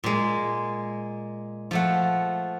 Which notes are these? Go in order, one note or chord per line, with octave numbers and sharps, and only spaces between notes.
A#2 G#3
F3 A3 F#5